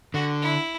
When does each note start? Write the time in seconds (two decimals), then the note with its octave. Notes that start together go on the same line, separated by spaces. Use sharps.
0.14 D3 F#4
0.42 E4